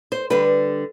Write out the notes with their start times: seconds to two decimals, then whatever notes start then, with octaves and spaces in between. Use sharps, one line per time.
0.12 C5
0.30 D3 G3 B4